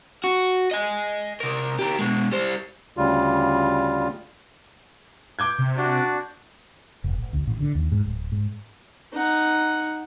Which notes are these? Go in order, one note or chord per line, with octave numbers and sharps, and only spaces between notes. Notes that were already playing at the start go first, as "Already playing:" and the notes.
F#4
D#5 G#5
C3 A#4
G4 A#4
B2 G#3
G3 C5
D2 C#3 G3 F4
D6 G6 G#6
C3
D4 F#4 D5
F1
A1
D2
A1
D3
D#2
G#2
D1
G#2
D#4 F#5